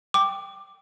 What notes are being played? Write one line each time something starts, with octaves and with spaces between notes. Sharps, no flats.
G5 D6